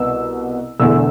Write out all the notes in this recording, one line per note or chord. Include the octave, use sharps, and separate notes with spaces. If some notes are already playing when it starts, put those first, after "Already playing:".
Already playing: C2 B2 B3 E6
E1 E2 D3 A3 E6